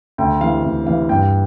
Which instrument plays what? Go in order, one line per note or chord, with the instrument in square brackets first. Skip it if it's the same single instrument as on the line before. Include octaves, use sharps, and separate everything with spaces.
[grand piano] D2 G5
C3 E3 F5
D2
C3 E3 F5
G2 G5